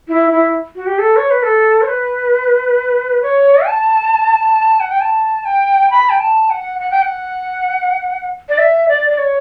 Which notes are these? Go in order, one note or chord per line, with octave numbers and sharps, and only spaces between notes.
E4
E4
F#4
G4
A4
C#5
B4
A4
C#5
B4
C#5
A5
F#5
G5
A5
G5
B5
G5
A5
F#5
F#5
G5
F#5
D5
E5
D5
D5
C#5